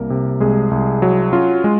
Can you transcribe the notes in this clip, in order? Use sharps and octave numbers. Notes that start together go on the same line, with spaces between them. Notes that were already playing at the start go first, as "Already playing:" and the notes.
Already playing: C2 A#3 A#4
C3
C2 G#3 G#4
C2
F#3
C#4 F4
G#3